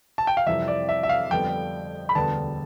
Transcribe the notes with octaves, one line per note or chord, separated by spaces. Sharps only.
A5
G5
F5
F2 C3 E3 G3 E5
D5
E5
E5
F5
F2 D3 G3 B3 G5
B5
E1 D2 D3 G3 B3 A5